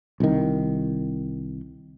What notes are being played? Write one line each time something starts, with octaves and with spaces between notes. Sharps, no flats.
C2 D#3